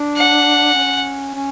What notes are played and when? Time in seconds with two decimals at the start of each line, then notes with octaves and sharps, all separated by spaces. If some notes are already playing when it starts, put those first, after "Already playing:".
Already playing: D4
0.17 F#5
0.75 C#4
1.34 C#4